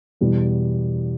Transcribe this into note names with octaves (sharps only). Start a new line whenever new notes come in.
E2 B2 G3 B3